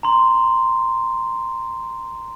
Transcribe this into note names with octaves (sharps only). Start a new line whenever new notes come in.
A#5 C6